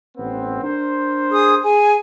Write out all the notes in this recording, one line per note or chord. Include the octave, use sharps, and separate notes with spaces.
A1 B3 C4
D4 A#4 C5
G#4 D#6
G#4 G#5